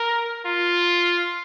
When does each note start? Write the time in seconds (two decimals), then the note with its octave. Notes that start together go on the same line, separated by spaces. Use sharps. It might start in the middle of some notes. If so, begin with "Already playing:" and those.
Already playing: A#4
0.46 F4